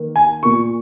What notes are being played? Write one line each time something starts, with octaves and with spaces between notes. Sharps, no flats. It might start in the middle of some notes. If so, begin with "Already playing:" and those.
Already playing: D#3 A#3
G#5
A#2 A#3 C#6